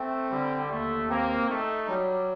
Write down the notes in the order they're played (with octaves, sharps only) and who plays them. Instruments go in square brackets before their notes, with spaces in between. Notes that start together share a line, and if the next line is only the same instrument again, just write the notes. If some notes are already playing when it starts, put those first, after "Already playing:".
Already playing: [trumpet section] A3 [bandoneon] C4
[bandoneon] D3 [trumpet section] G3
[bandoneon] D#2 [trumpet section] A3
[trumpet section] A#3 [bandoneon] C4
[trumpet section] A3 [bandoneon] D#4
[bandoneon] F#3 [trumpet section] G3